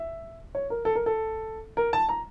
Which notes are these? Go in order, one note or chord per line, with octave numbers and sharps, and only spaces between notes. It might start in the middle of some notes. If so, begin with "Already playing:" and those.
Already playing: E5
C#5
A#4
A4
A#4
A4
A#4
A5
A#5